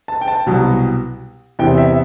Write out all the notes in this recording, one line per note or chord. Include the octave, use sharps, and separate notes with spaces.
A5
G5
A5
C2 B2 F#3
E2 C3 E3 G5
E5